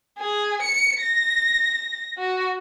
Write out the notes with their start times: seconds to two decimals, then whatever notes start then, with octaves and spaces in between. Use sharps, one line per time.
0.19 G#4
0.62 C#7
1.00 A#6
2.18 F#4